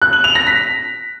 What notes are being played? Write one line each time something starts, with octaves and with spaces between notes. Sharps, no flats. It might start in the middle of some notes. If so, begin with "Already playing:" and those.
F#6
F#7
F7
A#6
B6